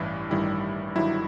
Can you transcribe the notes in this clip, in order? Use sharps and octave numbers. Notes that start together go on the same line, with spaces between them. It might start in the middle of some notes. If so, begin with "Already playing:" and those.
Already playing: A1 G2 E3 E4
A1 G2 D#3 G3 E4
G1 G2 D#3 F#3 E4